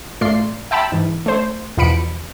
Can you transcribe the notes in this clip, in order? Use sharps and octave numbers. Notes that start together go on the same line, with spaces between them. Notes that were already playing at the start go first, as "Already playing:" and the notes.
A1 A3 F4 D5 C6 C7
E5 G5 A5 B5 E6
G#2 E3
A3 C5
E2 B2 F3 B5 C#7 D7